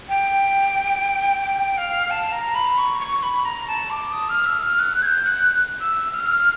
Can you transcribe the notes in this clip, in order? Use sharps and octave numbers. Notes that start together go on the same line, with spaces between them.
G5
G5
F5
A5
A#5
B5
C#6
C#6
B5
A#5
A5
D6
D#6
F6
E6
F6
F#6
G#6
G6
F#6
E6
F6